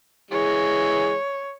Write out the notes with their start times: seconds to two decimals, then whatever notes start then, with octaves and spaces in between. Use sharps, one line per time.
0.31 E3 G#3 C#5